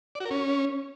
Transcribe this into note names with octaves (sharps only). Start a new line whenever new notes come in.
D5
F#4
A#4
C#4